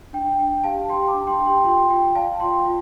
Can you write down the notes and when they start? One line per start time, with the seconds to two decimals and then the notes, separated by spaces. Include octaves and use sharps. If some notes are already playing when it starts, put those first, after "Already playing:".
0.13 D4 G5
0.39 D4 G5
0.64 G4 F5 A5
0.89 G4 G5 C6
1.08 A5 D6
1.14 D4
1.27 G5 C6
1.40 G4
1.46 G5 C6
1.64 F4 G5 C6
1.90 F4 G5
2.15 D5 F5 A5
2.40 F4 G5 C6
2.66 F4